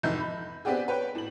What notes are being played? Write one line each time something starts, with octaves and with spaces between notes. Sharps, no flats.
F1 G#2 E3 D#4 E5 G6
B5
B3 C4 D4 G4 G#4
B4 C#5 G5
A2 F#7